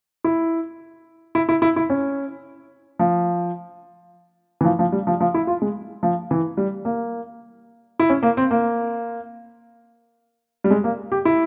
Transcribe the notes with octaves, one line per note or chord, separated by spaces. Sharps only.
E4
E4
E4
E4
E4
C#4
F3
E3
F3
F3
G3
F3
F3
E4
F4
G#3
F3
E3
G3
A#3
E4
C#4
A#3
C4
A#3
G3
G#3
A#3
G4
E4